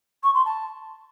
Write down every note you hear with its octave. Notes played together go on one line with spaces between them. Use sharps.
C#6
C6
A5